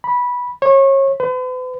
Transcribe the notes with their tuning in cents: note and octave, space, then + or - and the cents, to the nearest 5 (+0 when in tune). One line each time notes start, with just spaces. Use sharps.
B5 -15
C#5 -30
B4 +45